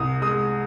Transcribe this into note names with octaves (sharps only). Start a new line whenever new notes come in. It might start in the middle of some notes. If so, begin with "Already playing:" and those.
Already playing: C2 D#6
G#3 D#6